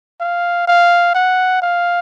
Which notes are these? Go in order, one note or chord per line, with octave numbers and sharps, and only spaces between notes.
F5
F5
F#5
F5